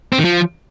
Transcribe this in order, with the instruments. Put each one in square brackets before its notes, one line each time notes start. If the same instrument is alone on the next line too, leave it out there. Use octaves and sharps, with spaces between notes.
[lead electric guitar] C4
D#3
F3